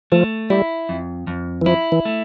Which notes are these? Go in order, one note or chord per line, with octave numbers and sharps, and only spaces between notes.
F3 A3
G3 E4
F2
F2
E3
F3 E4
E3
A3